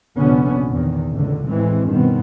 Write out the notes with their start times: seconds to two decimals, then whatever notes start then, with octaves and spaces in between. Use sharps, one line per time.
0.17 F1 A#1 D3 B3 C#4
0.69 E2 D#3
1.15 C#2 A2 D3
1.50 A1 E3 G#3 C4
1.89 G2 B2 D#3 B3 C4